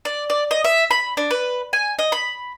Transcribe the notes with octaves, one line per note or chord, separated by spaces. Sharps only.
D5
D5
D#5
E5
B5
D4
B4
G#5
D#5
B5